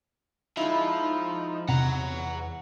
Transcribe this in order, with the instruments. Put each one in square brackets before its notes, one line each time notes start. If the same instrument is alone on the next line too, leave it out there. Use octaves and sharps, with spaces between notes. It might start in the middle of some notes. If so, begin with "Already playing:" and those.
[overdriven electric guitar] F3 [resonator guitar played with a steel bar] G#3 E4 [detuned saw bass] D#4
[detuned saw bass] E2 [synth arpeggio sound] C3 [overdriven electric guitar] F#5 A#5